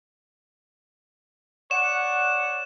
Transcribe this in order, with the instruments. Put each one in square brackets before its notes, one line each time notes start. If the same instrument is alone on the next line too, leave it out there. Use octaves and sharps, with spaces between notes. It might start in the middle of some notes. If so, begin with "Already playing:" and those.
[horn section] C#5 D5 F#5 [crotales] E7